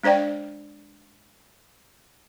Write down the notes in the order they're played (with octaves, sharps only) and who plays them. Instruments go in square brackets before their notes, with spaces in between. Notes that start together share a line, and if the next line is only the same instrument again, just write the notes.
[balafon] G#3 D4 C5 D5 G5